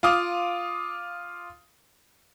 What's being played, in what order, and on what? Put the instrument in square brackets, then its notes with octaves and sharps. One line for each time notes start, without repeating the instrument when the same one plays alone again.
[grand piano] F4 F5 D6 D#6